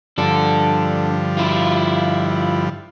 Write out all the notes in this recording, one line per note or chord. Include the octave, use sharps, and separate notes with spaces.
G2 D3 F3 D4 A4
E4 F4